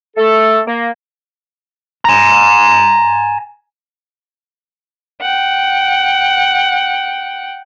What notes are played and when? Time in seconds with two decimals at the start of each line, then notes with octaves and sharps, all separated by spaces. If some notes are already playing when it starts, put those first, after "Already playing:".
0.17 A3 A4
0.66 A#3
2.05 G#5 A#5
5.21 F#5 G5